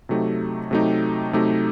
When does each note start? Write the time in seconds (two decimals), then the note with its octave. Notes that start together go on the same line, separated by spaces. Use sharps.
0.09 C3 F#3 A3 D#4 G4
0.71 C3 F#3 A3 D#4 G4
1.33 C3 F#3 A3 D#4 G4